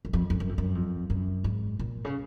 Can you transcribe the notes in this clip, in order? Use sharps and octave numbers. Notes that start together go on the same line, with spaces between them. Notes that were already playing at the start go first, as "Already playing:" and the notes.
F#2
F2
F2
F#2
F2
F#2
F2
F#2
G#2
A#2
C#3